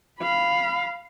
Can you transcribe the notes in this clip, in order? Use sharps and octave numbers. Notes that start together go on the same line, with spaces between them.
F5 B5